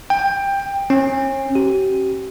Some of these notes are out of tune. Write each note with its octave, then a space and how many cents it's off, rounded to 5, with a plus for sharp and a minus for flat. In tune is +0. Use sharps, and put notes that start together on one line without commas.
G5 +15
C#4 -40
G4 -40